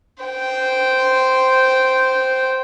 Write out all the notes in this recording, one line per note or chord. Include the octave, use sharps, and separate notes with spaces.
C5 G5